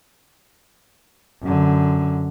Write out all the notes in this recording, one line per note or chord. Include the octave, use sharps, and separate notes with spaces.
F#2 D3